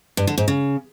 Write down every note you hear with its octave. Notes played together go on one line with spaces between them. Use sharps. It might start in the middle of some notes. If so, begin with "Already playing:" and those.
G2
D3
G#2
C#3